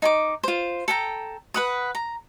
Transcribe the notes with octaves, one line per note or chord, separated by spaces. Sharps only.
D#4 G#5 D6
F4 C5
A4 G5 A#5
B4 F#5 D#6
A#5